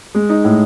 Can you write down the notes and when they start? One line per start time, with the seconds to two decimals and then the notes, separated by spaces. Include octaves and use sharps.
0.15 G#3
0.29 D#4
0.44 A2